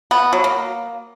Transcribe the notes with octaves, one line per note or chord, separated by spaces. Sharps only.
B3
F#3
A#3